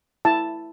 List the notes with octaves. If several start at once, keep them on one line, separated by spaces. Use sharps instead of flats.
E4 A5